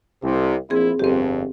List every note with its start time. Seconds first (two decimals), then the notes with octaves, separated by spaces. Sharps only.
0.23 C2 C3
0.70 A#1 C4 E4 G#4
0.99 G1 F2 C4 G4